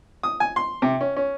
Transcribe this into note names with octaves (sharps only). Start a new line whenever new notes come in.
D#6
G#5
C6
C3
C#4
C#4